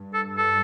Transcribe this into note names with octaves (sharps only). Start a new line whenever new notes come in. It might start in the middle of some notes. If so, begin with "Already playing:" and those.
Already playing: G2
A4
A4